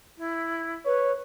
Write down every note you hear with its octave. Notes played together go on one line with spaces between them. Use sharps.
E4
B4 C#5